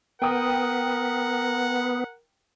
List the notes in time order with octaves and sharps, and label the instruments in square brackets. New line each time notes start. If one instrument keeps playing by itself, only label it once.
[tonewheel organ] B3 [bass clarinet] A#4 [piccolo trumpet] F#5 [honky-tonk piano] G5 D#6